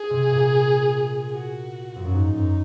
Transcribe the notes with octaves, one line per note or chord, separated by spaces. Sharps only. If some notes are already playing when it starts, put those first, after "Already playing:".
Already playing: G#4
C3
A#2
F#4
F2
F#2
G#2 D#4
F#2